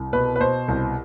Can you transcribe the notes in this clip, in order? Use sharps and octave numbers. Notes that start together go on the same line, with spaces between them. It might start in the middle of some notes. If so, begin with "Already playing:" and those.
Already playing: C2
B2 B4
B4
B2 C5
C2